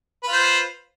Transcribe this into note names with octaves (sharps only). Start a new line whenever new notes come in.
F4 B4 C5